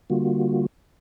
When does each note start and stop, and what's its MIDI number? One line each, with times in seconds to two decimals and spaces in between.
0.10 0.66 50
0.10 0.66 55
0.10 0.66 58
0.10 0.66 65
0.10 0.66 66